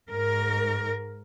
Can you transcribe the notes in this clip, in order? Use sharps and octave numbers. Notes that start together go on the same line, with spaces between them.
G#2 A#4